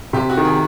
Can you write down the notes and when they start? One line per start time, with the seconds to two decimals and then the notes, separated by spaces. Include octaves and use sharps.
0.13 C3 G4
0.30 F#4
0.37 D#3
0.45 G#4